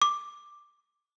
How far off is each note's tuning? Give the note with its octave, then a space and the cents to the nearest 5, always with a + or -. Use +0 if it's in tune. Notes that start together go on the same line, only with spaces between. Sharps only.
D6 +5